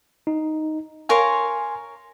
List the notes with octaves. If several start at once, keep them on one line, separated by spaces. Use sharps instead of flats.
D#4
A#4 C#5 F5 G#5 C6